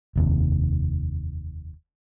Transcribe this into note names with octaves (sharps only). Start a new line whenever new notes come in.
F1 D#2 C3